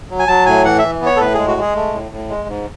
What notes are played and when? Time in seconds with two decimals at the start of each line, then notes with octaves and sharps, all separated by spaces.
0.11 F#3
0.19 G#5
0.28 F#3 A5
0.46 A2 G#5
0.65 E3 F#5
0.78 E3 E5
1.01 B3
1.06 C#5
1.16 A4
1.19 A2 B4
1.34 G#3 G#4
1.48 F#4
1.57 G#3 G#4
1.75 A3
1.93 A2
2.12 A2
2.30 G#3
2.49 G#2